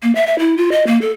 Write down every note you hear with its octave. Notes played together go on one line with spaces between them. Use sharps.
A#3
E5
E5
E4
F4
D#5
A#3
A4